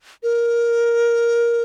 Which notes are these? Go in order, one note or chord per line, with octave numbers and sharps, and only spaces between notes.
A#4